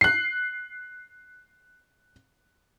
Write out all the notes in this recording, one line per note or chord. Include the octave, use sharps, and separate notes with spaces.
F#6 C7